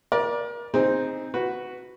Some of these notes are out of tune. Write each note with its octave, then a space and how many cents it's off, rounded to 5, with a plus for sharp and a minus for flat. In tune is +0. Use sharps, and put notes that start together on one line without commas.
A#4 +35 D5 +0
C4 +0 D#4 +0 G#4 -25
F#4 +0 B4 +0